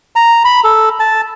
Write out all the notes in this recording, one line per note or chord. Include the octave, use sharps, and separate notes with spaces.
A#5
B5
A4
A5